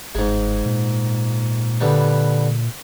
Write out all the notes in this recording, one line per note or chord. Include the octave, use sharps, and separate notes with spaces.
G1 G#2 G#3
A#2
D3 G3 B4